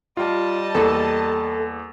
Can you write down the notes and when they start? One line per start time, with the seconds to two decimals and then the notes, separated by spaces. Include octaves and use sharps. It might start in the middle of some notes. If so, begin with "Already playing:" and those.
0.17 G3 F4 D#5 A5
0.75 E2 A#3 A4